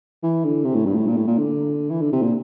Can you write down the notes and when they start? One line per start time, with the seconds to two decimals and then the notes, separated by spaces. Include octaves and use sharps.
0.23 E3
0.44 D3
0.65 C3
0.75 A2
0.86 G2
0.96 A2
1.07 A#2
1.17 A2
1.27 A#2
1.38 D3
1.90 E3
2.01 D3
2.12 C3
2.23 A#2